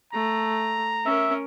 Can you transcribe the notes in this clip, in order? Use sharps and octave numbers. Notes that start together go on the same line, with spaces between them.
A3 A#5
C#4 A#4 E5